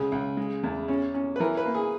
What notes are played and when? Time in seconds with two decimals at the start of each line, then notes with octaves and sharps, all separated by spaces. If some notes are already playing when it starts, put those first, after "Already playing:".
Already playing: C#2 G#4
0.12 C#2
0.37 G#3
0.63 E2
0.88 C#4
1.14 C#4
1.36 B4
1.40 E3 A#4
1.57 B4
1.66 A#3
1.75 G#4